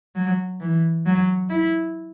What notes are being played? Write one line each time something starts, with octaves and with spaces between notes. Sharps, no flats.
F#3
E3
F#3
E4